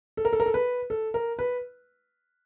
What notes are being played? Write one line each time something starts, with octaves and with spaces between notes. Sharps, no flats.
A4
A#4
A4
A#4
A4
B4
A4
A#4
B4